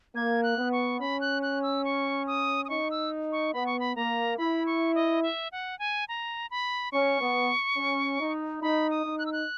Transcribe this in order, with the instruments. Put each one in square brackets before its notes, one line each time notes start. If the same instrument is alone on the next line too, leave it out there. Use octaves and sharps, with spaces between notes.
[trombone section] A#3 [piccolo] G#6
[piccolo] F#6
[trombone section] B3
[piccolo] C#6
[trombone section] C#4 [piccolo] B5
[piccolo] F#6
F#6
E6
C#6
D#6
D#6
[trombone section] D#4 [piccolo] C#6
[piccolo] E6
C#6
[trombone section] B3 [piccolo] B5
[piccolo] C#6
B5
[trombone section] A#3 [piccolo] A#5
[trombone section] E4 [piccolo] B5
[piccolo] C#6
D#5
E5
F#5
G#5
A#5
B5
[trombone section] C#4 [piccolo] C#6
[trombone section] B3
C#4
D#4
[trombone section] D#4 [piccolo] B5
[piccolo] D#6
[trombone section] D#4
[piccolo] F#6
E6
F#6